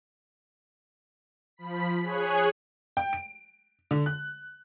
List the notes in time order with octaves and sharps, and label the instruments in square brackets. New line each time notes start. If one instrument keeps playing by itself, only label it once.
[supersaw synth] F3 B5 B6
G#4 C#5 G#5 F#6
[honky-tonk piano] G5
D7
D3
F#6